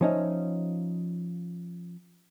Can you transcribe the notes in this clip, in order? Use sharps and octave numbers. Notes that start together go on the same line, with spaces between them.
F3 C#4 D#4 E5